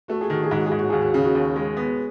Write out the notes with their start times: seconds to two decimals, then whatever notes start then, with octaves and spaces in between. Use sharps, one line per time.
0.08 A3 F#4
0.21 G#4
0.30 D#3 F#4
0.43 G#4
0.51 G#2 F#4
0.67 G#2 G#4
0.79 F#4
0.90 D#2 G#4
1.02 F#4
1.13 C#3 G#4
1.25 F#4
1.35 D#2
1.56 G#3
1.77 B3